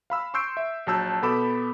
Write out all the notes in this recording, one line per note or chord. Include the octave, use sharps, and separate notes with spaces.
F5 B5 E6
C6 C#6 E6 G6 C7 D7
E5
A#1 F#3 A5 E6 G6
B2 B3 A4 B5 D6 E7